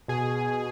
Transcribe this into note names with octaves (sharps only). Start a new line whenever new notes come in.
B2 G#4